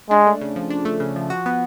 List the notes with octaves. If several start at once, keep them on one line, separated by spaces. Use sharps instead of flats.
G#3 D4
A3
C#3
F3
D4
A3
C#3
F3
F#4
B3